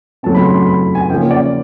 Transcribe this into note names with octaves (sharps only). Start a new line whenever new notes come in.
C#3 F#3 A3 C4 A5
B5
C6
C6
B5
G#5
C#3 F3 A#3 C#4 G5
D5